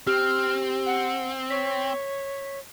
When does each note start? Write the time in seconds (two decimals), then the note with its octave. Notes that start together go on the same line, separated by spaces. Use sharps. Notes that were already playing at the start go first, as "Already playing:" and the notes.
0.07 C4 G4 F6
0.86 F#5
1.50 C#5 B6